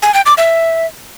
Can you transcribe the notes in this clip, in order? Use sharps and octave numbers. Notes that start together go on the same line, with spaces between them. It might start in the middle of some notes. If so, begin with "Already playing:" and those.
G#5
G5
D6
E5